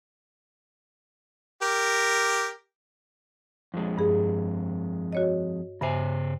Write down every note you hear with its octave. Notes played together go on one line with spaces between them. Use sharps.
G4 A#4
F2 G#3
G2 G#4
F#4 C#5 D#5
G2 C#3 C5 E5 G#5